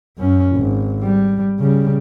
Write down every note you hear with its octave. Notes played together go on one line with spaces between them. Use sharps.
F#2 C#4
G#1
G3
C#3 G3